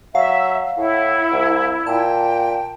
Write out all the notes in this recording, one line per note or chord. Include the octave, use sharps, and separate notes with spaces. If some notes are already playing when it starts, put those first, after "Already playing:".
F#3 E5 F5
A2 E4 F#5
C2
A#2 G5 A5